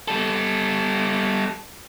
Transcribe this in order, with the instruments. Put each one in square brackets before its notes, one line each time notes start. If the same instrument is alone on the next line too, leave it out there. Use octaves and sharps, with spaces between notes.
[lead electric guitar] G3 A4